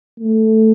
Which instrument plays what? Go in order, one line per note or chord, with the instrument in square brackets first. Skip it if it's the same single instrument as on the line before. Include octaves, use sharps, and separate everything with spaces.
[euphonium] A3